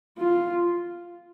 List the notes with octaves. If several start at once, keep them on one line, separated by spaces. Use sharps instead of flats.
F4